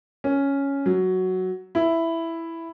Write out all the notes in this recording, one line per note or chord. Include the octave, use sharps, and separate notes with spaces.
C#4
F#3
E4